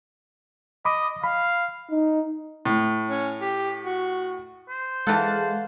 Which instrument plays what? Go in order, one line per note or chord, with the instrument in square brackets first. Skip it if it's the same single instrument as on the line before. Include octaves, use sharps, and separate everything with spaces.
[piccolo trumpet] D#5 [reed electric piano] B5 D6 D#6
[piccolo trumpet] F5 [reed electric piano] B5
[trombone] D#4
[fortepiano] A2
[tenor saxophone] C#4
G4
F#4
[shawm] C5
[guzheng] E3 A4 [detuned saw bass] G#3 [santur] F5 F#5 A5